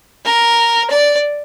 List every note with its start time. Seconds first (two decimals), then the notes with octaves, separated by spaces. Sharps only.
0.25 A#4
0.90 D5